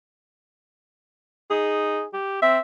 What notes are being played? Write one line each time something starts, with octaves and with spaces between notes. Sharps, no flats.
D#4 G#4
G4
C4 E5